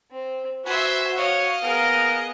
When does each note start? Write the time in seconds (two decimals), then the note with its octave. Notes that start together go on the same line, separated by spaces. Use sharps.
0.11 C4
0.66 F#4 B4 C5 E5 G#5
1.18 C#5 D#5 F5
1.63 B3 G#4 A#4